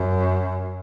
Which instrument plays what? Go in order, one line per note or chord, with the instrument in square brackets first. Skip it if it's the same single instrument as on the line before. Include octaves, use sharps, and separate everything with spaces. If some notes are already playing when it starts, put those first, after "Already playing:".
Already playing: [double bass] F#2